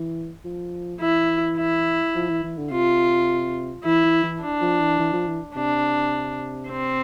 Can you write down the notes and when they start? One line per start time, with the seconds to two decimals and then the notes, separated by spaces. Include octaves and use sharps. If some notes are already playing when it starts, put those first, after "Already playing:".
Already playing: E3
0.45 F3
1.01 E3 E4
1.57 E4
2.15 F3
2.30 E3
2.43 E3
2.58 D3
2.71 C3 F4
3.85 E3 E4
4.04 E3
4.23 E3
4.43 D4
4.61 F3
4.80 E3
4.99 E3
5.13 F3
5.27 E3
5.55 C3 D4
6.70 C4